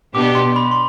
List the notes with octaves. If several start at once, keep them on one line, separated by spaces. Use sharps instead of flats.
B2 B3 D4 G4 D6
C6
B5
C6